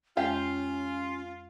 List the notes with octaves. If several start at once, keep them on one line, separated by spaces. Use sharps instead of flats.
F2 G#3 C#4 F4 G4 F5 G6